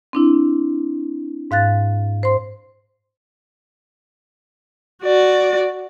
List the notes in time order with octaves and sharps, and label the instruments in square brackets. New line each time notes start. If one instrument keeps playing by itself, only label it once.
[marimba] C4 D4 E4
G#2 F5 F#6 A6
C5 C6
[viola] F#4 D5